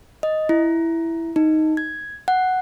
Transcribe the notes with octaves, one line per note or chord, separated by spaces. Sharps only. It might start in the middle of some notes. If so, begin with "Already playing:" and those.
D#5
E4
D#4
G#6
F#5